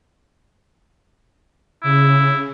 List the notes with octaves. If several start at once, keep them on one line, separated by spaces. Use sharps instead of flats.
C#3 E4